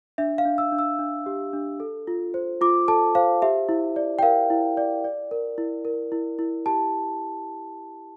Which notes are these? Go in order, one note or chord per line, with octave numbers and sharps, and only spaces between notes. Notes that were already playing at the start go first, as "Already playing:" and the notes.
D4 E5
F5
D4
E6
D4
E6
D4
G4
D4
A4
F4
C5
F4 D6
A4 A5
C5 F5
G4 E5
E4
D5
G5
A#4 F5
E4
D5
D5
A#4
E4
A#4
E4
E4
G4 A5